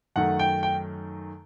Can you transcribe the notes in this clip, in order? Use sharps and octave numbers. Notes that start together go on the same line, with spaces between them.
F#2 D#3 A3 F#5
G5
G5